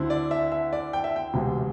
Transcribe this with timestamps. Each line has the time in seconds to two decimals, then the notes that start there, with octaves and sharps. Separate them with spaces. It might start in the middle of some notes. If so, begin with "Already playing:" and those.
Already playing: D2 D3 C4 E4
0.10 D5
0.31 E5
0.52 E5
0.73 D5
0.93 G5
1.04 E5
1.16 G5
1.34 E1 D2 C3